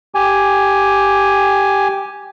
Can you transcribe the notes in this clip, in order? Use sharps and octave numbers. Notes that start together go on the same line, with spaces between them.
G4 G#5